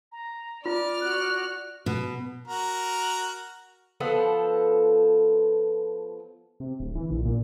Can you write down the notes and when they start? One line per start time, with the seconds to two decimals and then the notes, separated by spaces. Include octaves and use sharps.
0.12 A#5
0.66 F4 D5 F6
1.01 F#4 F#6
1.86 B2
2.48 F#4 A#4
4.00 F3 B3 A4 F#5
6.60 C3
6.80 D1
6.95 E3
7.11 A#1
7.25 A#2